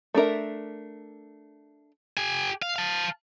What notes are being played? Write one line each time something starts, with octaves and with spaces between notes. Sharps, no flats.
A3 D4 A#4 E5
G4 G#5
F5
F5 A5